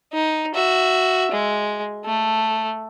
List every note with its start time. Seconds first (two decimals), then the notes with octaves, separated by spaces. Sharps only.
0.13 D#4
0.54 F#4 E5
1.31 G#3
2.05 A3